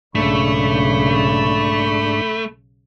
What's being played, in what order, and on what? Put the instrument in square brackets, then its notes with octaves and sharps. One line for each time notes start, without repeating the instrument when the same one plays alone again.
[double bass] B1 C#3 [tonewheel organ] G#2 D4 [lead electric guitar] A3 [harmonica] B5 C#6